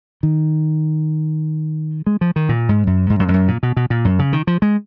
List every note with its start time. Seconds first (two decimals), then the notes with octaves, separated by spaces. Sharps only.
0.23 D#3
2.07 G#3
2.21 F3
2.36 D#3
2.49 A#2
2.69 G#2
2.87 F#2
3.10 G#2
3.20 F#2
3.28 F2
3.34 F#2
3.48 A#2
3.63 B2
3.77 B2
3.90 A#2
4.05 F#2
4.19 C#3
4.33 D#3
4.47 F3
4.62 G#3